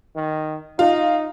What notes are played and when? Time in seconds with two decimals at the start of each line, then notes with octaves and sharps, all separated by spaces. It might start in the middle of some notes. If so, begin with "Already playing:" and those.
0.16 D#3
0.79 D#4 F4